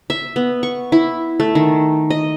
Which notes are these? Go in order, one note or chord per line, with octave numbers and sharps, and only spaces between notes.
E5
B3
C#6
E4
A3
D#3
D#5